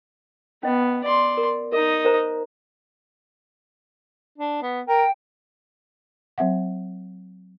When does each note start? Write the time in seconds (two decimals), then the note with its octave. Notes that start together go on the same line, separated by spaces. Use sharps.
0.63 B3 C#4 D#5
1.04 D5 C6
1.37 A#4
1.72 D#4 A#4 D#5
2.05 A#4 C5 A#5
4.38 D4
4.62 B3
4.87 A#4 G5
6.38 F#3 C4 E5 F#5